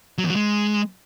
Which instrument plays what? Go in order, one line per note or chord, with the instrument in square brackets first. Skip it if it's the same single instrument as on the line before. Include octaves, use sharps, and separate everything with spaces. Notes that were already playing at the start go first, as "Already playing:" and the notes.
[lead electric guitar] F#3
E2
F#3
G#3